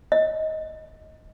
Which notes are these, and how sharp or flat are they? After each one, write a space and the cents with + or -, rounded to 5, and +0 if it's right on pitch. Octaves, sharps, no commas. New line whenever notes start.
D#5 +15